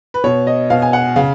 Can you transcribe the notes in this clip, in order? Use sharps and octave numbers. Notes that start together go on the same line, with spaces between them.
B4
B2 C#5
D#5
B2 F5
G#5
F#5
C#3 F5